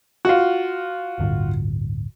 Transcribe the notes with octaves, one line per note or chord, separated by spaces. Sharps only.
F4 F#4
D1 G1